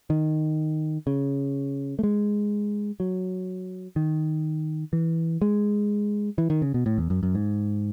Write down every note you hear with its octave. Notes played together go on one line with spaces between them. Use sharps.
D#3
C#3
A3
G#3
F#3
D#3
E3
G#3
E3
D#3
C#3
B2
A2
E2
F#2
F#2
G#2